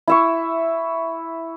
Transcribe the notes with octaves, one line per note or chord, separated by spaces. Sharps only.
E4 E5 C#6